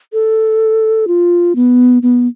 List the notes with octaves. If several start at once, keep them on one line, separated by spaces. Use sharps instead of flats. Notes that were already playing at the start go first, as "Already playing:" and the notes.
A4
F4
B3
B3